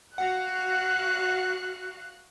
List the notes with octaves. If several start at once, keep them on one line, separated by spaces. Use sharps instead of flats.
F#4 F5 F#5 F#6